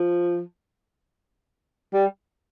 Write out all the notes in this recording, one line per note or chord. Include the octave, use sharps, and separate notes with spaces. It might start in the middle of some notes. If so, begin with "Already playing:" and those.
Already playing: F3
G3